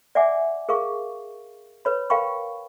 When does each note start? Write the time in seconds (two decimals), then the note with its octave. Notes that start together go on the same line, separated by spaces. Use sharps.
0.15 D5 E5 F#5 G#5 D6
0.69 G#4 A#4 F5 C#6
1.85 B4 C#5 B5
2.10 A#4 F5 G5 B5 C#6